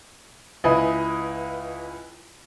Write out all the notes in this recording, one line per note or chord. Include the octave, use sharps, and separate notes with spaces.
C#2 E4 B4 D#5 G#5 B5